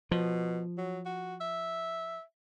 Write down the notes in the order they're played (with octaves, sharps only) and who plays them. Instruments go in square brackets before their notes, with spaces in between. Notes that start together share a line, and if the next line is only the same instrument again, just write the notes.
[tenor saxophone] B2 [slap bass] F3
[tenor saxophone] F#3
F#4
E5